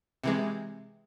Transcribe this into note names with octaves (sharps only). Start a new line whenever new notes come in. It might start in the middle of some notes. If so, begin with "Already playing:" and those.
C3 E3 G#3